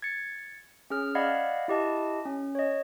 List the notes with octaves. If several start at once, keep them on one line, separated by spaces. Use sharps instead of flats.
G#6 A6 C#7
C#4 G#4 F6
D5 D#5 F5 F#5 B5 G#6
E4 G4 D#5 A5
C#4
C#5 D#5